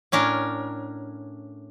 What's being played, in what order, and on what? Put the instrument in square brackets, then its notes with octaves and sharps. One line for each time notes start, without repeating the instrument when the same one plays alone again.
[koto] A2 C#4 D4 A#4